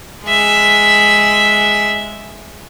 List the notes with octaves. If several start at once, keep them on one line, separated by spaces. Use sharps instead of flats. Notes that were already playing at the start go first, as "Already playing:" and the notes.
G#3 E5